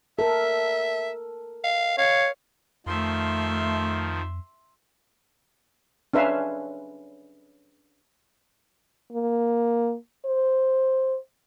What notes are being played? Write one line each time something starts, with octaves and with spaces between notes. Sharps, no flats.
A4 A#4 E5
F5
C#5 F5
F2 D#3 F3 A3 E5 C6
C#4 D4 B4 E5 F5
A#3
C5